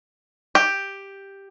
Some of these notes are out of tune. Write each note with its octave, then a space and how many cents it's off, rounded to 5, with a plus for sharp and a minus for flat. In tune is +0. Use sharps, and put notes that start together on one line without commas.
G4 +5